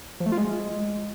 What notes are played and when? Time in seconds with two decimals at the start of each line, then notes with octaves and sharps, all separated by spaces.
0.20 F3
0.26 A3
0.32 F4
0.38 G#3